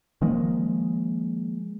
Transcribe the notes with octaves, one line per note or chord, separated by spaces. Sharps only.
D#3 F3 G#3 A#3